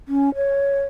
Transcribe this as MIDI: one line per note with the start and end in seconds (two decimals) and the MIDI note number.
0.08 0.34 61
0.35 0.83 73